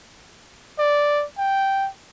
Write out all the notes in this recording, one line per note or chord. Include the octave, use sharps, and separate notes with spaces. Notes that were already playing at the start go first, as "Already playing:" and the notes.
D5
G5